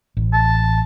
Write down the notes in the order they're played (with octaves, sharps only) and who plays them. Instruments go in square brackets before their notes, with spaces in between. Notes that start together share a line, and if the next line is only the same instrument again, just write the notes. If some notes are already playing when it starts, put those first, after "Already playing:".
[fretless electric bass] A1
[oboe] A5